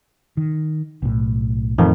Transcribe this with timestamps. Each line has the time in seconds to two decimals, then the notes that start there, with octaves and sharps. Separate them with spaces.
0.37 D#3
1.02 B1 A2
1.78 F2 A2 D#3 E3 A3